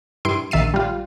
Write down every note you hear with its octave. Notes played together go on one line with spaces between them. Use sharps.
G2 E4 C6 D7
A#1 D#3 E5 A6 C7 D#7
G3 F4